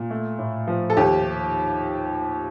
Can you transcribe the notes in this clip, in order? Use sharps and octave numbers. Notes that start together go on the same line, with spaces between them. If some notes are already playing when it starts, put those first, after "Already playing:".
Already playing: A#2
A3
A2
F3
A4
D#2 G4